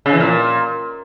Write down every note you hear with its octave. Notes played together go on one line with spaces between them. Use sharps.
C#3
E3
A#2